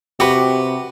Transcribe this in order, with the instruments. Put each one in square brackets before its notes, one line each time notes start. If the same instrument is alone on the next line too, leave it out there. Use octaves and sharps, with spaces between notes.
[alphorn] C3 [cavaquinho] F#4 B4 [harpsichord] G4